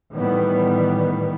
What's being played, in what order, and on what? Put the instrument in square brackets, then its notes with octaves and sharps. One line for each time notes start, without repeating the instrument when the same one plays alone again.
[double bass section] A2 D#3 E3 G3 B3